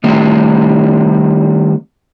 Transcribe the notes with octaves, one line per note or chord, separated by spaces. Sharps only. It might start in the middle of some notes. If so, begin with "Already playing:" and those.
D#3 G3 A3 C4